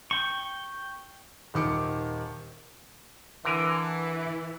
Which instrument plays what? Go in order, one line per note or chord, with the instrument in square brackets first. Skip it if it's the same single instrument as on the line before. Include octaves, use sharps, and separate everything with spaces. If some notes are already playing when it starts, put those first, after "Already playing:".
[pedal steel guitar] G5 C#6
[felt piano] D#1 D#3 D6 C#7
[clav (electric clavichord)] D3 A#4 G#5 [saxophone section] E3